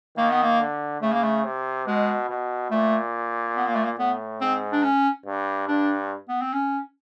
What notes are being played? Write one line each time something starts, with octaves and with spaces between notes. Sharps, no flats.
D#3 A#3
B3
A#3
D3
C#3 A3
A#3
A3
C3
B2 G#3
B2
A#2 A3
B3
A#3
A3
A#3
A2 B3
G#2 C4
D4
C#4
G2
G2 D4
B3
C4
C#4